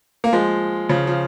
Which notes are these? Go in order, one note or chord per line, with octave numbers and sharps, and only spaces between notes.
A#3
F3 G#3
C#3 F3
F3